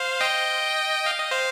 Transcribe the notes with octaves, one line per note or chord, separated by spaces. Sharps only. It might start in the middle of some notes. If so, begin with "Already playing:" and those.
Already playing: C5 F5
D#5 G5
F5
D#5
C5 F5